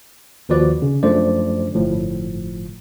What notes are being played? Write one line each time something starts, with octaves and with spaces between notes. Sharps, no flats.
D#2 F3 F#4 B4 D5
C#3
F#2 F3 A3 D4 C5 D5
G1 A2 F3